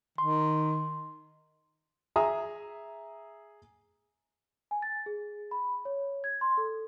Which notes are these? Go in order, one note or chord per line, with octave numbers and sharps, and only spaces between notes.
D#3 C6
G#4 E5 A#5 D#6
G#5
A6
G#4
B5
C#5
G#6
C6
A4